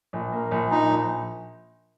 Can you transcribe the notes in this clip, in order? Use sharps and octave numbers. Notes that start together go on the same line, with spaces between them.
A#1
A#3
A#1
A#2 D#4
A#1